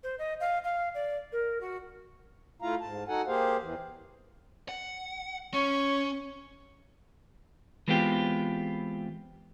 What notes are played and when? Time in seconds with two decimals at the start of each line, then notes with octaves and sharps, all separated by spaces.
0.03 C5
0.18 D#5
0.40 F5
0.64 F5
0.94 D5
1.32 A#4
1.61 F#4
2.62 A3 E4 F4 F5 A#5
2.81 G#2 A5
3.08 D#4 F#4 A4 F#5 G#5
3.27 A#3 G4 G#4 C5 F5
3.62 E2 E3
4.69 F#5
5.54 C#4 C#5 C#6
7.88 E3 G#3 B3 C4 F4 G4